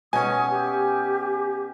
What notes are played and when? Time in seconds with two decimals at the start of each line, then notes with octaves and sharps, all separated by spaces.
0.13 B2 C#4 G#5 D#6
0.50 G4